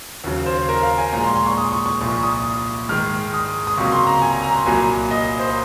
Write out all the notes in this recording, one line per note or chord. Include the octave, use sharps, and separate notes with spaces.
D#2 C#3 F#3
C5
A#4
F5
G#5
A#2 F3 G#3 A#5
C6
C6
C#6
D#6
C#6
C#6
C2 A#2 F3 C#6
D#6
G#2 D#3 G#3 F6
D#6
D#6
C#2 C3 F#3 A#3 C#6
C6
A#5
G#5
A#5
A#5
C6
C2 A#2 F#3 A#3 G#5
D#5
C5